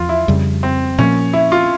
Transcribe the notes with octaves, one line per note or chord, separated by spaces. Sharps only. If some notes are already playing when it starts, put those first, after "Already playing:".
Already playing: E2 F3 F4
E4
F2 C#3 G3
C4
A#2 F3 A#3 C#4
E4
F4